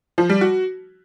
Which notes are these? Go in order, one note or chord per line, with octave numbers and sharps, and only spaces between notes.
F3
G3
F#4